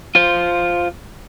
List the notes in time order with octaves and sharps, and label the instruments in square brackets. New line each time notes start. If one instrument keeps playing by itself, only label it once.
[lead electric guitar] F4 C5